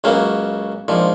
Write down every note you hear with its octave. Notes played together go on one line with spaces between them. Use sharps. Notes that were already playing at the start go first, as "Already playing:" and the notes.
C#2 C#3 F#3 A#3
A#1 G#2 F3